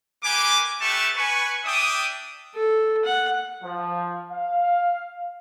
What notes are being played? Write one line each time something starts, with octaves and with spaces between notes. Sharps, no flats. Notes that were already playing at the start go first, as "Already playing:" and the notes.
A#3 G4 B4 G#5 D6
G3 A3 G4 B4 A5 C#6
B4 G#5 C#6
D4 E5 G5 D6 D#6
A4
F#5
F3
F5